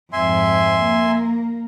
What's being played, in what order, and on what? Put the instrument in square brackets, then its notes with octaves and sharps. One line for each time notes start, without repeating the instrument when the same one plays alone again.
[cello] F2 G#2 [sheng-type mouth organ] E5 G#5 C6
[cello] A#3